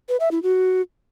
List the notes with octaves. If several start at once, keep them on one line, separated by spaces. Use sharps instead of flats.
B4
E5
E4
F#4